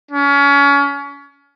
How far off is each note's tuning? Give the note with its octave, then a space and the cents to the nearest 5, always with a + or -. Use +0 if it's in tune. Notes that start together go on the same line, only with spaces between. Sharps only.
C#4 +30